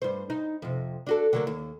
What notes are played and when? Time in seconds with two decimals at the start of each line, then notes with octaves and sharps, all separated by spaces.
0.02 G2 C5
0.30 D#4
0.62 F2 C3
1.07 D4 F#4 A4
1.33 D3 F#3 A#3
1.47 D#2